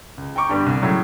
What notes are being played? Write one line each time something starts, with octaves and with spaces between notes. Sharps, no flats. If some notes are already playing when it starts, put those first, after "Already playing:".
C#2
G5 A#5 C#6 D6
G2 D3 G3 B3
C2
A2 C#3 F#3